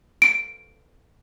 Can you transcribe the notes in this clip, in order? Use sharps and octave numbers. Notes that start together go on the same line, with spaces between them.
D7